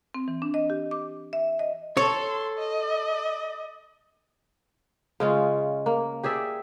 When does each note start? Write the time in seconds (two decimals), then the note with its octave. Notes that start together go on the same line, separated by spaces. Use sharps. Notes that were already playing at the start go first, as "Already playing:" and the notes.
0.14 C4
0.28 E3
0.42 D4
0.54 D#5
0.70 G4
0.91 D6
1.33 E5
1.59 D#5
1.97 A4 C#5 C6
2.59 D#5
5.20 C#3 G#3 C#4 F4
5.86 A#3
6.23 G4 G#4 D5 E5